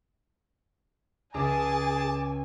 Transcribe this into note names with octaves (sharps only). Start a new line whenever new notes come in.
C#2 G#4 E5 G#5 A5 D6